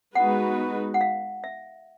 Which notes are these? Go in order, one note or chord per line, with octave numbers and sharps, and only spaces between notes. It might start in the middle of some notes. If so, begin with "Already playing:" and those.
G#3 B3 D#4 F#4 B4 F#5
F#5
F5
E5